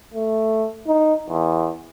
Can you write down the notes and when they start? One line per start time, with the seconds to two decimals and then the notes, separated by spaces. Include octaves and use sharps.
0.14 A3
0.87 D#4
1.29 E2